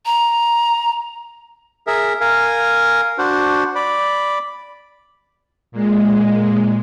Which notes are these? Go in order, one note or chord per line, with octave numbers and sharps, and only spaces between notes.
A#5
G#4 A#4 E5
A#4 F5 G#5
D4 F#4 C5
D5 B5
A#2 G#3